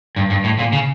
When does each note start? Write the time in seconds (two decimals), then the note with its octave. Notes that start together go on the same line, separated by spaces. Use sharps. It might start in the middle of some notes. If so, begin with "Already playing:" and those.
0.16 G2
0.30 G2
0.44 A2
0.59 A#2
0.72 C#3